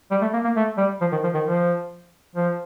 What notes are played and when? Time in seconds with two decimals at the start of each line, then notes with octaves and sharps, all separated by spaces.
0.11 G3
0.22 A3
0.33 A#3
0.44 A#3
0.56 A3
0.78 G3
1.01 F3
1.12 D#3
1.24 F3
1.34 D#3
1.45 F3
2.36 F3